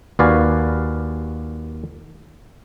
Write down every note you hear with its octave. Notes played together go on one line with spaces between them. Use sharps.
D#2 F#4 B4 D5 F5 G#5